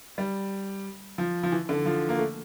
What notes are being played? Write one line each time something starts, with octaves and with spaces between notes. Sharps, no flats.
G3
F3
F3
E3
D3
F3
A#3
A3